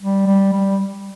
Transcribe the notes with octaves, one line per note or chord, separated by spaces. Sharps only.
G3
G3
G3